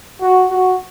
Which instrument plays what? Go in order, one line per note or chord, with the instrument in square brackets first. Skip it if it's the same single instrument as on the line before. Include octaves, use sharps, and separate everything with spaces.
[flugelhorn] F#4
F#4